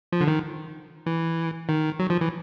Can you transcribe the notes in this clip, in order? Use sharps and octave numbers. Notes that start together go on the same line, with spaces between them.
F3
D3
D#3
E3
D#3
F#3
F3
E3